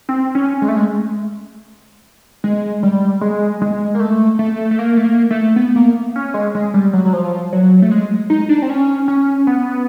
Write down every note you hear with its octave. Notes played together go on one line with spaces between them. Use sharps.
C4
C#4
G#3
A3
G#3
G#3
G3
G#3
G#3
A#3
A3
A3
A3
A#3
A3
A#3
A3
B3
A#3
C#4
G#3
G#3
G3
F#3
F#3
F3
F#3
A3
G#3
D#4
D4
C4
C#4
C#4
B3